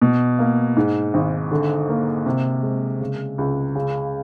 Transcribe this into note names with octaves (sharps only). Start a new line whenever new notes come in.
B2
A#3
G#2
G#1
D3
A#3
C3
G#3
C#3
C#2
C#3